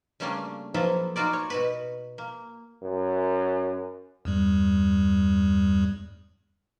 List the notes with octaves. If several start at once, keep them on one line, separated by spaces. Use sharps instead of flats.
C#3 G3 A3 A#3 C#4 D4
F3 F#3 A#3 B3 E4 A4
D#4 F4 F#4 A#4 D5
C#5
B2 F#4 B4
A#3
F#2
E2 G2 G3